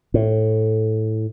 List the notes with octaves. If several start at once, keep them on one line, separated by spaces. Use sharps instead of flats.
A2